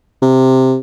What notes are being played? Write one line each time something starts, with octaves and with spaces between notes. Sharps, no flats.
C3